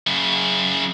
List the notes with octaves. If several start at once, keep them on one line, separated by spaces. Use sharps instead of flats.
F#2 C#3